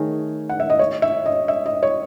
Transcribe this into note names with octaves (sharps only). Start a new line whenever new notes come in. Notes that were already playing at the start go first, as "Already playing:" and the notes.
Already playing: D#3 A3 G#4 C#5
F#5
E5
D#5
C#5
E5
D#5
E5
D#5
C#5